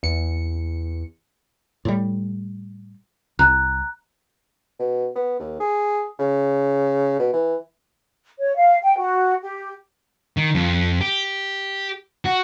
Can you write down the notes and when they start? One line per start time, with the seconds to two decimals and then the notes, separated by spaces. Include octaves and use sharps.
0.03 E2 C#7
1.85 A2 G3
3.39 C2 A#5 F#6
4.79 B2
5.16 B3
5.40 D#2
5.60 G#4
6.19 C#3
7.19 B2
7.33 E3
8.39 C#5
8.56 F5
8.83 G5
8.98 F#4
9.42 G4
10.37 D#3
10.55 F2
11.01 G4
12.25 F#4